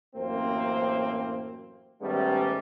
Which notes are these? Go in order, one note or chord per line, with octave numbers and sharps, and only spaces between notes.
A1 F#2 A#3 C4 C5
G#2 D#3 G3 A3 B3 C#4